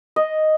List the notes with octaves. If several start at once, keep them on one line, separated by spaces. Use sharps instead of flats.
D#5